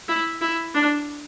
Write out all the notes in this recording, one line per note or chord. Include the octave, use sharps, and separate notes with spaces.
E4
E4
D4